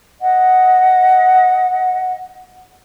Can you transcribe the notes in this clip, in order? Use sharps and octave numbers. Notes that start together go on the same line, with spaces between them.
D#5 F#5